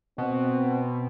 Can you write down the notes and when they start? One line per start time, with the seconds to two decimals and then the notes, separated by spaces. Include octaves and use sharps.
0.18 B2 C4